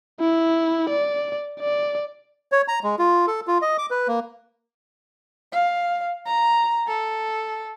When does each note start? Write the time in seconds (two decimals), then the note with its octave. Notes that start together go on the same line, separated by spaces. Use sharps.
0.20 E4
0.90 D5
1.61 D5
2.52 C#5
2.68 A#5
2.83 G#3
2.99 F4
3.27 A4
3.47 F4
3.62 D#5
3.78 D6
3.91 B4
4.08 A#3
5.52 F5
6.26 A#5
6.87 A4